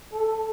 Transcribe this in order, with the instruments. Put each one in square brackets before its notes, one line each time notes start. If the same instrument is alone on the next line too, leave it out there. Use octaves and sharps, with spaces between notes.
[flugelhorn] A4